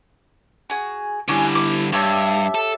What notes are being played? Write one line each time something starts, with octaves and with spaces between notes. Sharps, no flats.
F#4 G#4
D3 G3 C#4 E4 D6 F#6
D6
G2 G4 C#5 E5 A5
A4